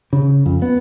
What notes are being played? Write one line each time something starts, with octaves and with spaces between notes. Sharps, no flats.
C#3
F2
B3